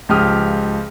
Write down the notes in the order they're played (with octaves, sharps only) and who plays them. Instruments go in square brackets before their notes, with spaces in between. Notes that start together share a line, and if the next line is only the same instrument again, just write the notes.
[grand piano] C#2 F3 G4 D#6 F6